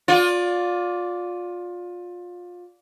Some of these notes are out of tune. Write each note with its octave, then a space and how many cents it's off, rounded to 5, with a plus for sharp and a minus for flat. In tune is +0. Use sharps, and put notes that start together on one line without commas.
F4 +25 D5 -15